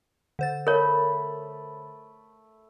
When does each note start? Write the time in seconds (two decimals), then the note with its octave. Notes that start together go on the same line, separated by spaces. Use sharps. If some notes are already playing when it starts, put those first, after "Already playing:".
0.39 D3 C5 A6
0.67 A3 A#4 C#5 B5 D#6